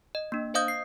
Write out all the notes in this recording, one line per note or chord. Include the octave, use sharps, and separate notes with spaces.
D#5
A#3 D4
C5 D#5 F5 D#6 G6
C7